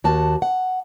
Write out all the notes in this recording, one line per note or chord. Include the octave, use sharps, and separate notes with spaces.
D#2 F#4 A5
F#5